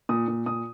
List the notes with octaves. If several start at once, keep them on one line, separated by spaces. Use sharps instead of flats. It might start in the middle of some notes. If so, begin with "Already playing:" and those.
A#2 D#6
A#2
A#2 D#6